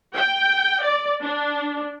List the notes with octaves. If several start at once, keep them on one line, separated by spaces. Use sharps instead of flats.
G5
D5
D4